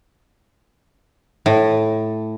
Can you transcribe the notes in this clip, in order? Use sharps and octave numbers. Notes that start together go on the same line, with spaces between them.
A2